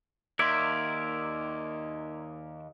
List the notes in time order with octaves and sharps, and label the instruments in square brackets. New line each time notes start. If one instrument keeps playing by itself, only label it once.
[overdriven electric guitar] D#2 [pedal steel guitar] A#4 D5 E5 [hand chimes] C6 G#6